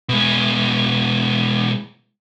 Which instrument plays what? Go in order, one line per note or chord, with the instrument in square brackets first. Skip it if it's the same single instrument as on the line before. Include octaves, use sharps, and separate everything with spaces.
[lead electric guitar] B2 G#3